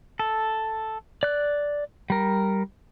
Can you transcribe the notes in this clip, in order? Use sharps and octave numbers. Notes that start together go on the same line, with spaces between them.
A4
D5 F#6
G3 A#4